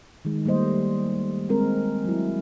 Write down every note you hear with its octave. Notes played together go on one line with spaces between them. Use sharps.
D#3 G#3
G3 A3 A#3 C5 D#5
G#3 C4 A#4
F#3 E4